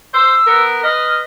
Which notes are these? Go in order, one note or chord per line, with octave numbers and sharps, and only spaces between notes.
C5 E6
B3 A#4
B4 D#5 F6